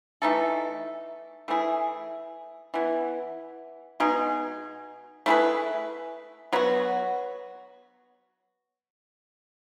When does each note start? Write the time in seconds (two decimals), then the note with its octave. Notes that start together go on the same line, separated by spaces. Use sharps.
0.22 E3 A3 D#4 A4
1.48 E3 A3 E4 G#4
2.74 E3 B3 E4
4.00 B2 G#3 D#4 G#4
5.26 A3 E4 G#4 B4
6.53 F#3 B3 F#4